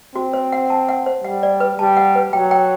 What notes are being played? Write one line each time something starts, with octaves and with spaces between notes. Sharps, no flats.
C4 F#4
C5
F#5
A5
F#5
C5
G3 F#5
D5
B4
G3 A5
F#5
B4
F#3 G5
G5